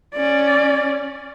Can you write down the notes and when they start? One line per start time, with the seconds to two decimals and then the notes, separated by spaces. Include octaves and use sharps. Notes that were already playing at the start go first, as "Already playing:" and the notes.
0.15 C#4 D5